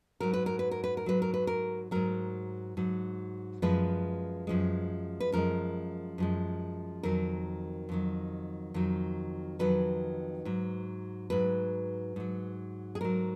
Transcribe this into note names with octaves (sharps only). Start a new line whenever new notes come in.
G#2 F#3 A#4
B4
A#4
B4
A#4
B4
A#4
G#2 F#3 B4
A#4
B4
A#4
G#2 F#3 A#4
G#2 F#3
F#2 F3 G#3 B4
F#2 F3 G#3
B4
F#2 F3 G#3 A#4
F#2 F3 G#3
F2 D#3 F#3 A#4
F2 D#3 F#3
F2 D#3 F#3
F2 D#3 F#3 B4
G#2 F#3
G#2 F#3 B4
G#2 F#3
G#4
G#2 F#3 A#4